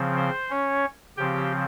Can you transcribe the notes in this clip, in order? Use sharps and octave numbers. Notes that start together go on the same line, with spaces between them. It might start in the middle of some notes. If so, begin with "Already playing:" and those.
Already playing: C#3 F3 C4
C5
C#4 C#5
C#3 F3 C4 G4 G5